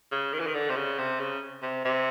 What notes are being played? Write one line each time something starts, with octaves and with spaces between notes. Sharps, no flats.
C#3
D#3
E3
D#3
D3
C3
C#3
C3
C#3
C3
C3